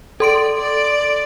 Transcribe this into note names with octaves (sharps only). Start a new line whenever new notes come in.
A4 D5 C6 D7
D5